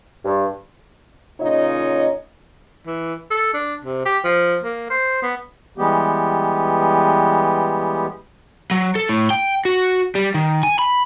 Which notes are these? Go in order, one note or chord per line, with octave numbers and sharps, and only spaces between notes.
G2
A#2 C#3 D#4 F4 C#5 D#5
E3
A4
D4
C3
G4
F3
A#3
C5
B3
E3 G3 G#3 B3 G4
F#3
A4
A2
G5
F#4
G3
D#3
G#5
B5